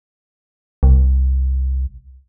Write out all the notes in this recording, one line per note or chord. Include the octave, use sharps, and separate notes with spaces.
C2